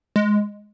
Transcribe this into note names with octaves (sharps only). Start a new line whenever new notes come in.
G#3